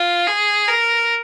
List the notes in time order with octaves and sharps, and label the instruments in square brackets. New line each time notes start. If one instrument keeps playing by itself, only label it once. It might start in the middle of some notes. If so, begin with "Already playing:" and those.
Already playing: [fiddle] F4
G#4
A#4